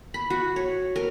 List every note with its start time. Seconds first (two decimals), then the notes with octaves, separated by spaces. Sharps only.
0.14 B5
0.30 F#4
0.56 C#5
0.96 A#4